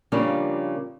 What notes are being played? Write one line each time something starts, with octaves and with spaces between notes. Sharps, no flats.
C#3 F3 G3 A#3 D4